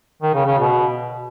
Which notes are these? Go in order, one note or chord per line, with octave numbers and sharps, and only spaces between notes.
D#3
C#3
C#3
B2